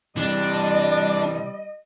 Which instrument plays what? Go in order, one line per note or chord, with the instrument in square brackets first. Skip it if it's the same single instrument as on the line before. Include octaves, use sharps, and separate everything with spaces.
[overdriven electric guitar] C3 E3 [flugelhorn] G3 [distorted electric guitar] D4 [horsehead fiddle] D#5